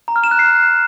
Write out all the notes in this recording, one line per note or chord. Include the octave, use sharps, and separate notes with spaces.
A#5
F6
E7
F#6
C7